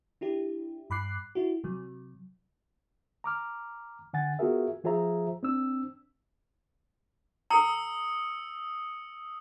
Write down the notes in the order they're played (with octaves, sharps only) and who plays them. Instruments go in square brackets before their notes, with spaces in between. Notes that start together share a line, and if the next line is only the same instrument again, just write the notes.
[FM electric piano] D4 E4 G4
G2 B5 D6 F#6 C7
E4 F#4
C3 F#3
[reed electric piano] A#5 D6 F6
D3 F#5 G#5 A6
B3 F4 F#4 G#4 A#4 E5
F3 F4 G#4 C5 E5 A#5
C4 D4 E6
[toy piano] A4 A#5 [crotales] D#6 E6 C#7